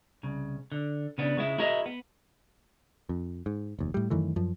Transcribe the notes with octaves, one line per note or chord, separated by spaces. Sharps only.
C2 C#3
D3
C#3 B3 D4
C#3 G#3 E4
E4 F#4 G#4 A#4 D#5 E5
B3
F2
G#2
F1 D#2
A2 G3
F#2 D#3 E3 A3
F#2 F3